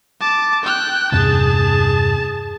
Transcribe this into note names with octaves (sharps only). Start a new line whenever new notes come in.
A5 D6
G5 F#6
E2 G2 C3 G#4 A5